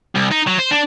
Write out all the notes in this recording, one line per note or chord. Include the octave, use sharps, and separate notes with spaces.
C2
D#4
F#3
C5
D4